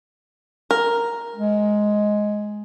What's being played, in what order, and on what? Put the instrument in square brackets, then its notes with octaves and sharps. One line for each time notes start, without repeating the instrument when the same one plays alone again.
[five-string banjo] A#4
[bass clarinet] G#3